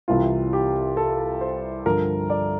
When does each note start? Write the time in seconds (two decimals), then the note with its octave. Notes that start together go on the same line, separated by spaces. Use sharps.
0.08 C2 C3 E3 F4
0.53 G4
0.97 A4
1.41 C5
1.86 G2 D3 F3 A#4
2.30 D5